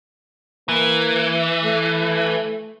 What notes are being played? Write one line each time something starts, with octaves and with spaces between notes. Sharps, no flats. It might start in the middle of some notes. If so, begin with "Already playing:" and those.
E3 A#3
A3